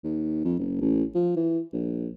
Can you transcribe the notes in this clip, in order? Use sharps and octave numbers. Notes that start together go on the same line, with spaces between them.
D#2
F2
F#1
A1
F3
E3
A#1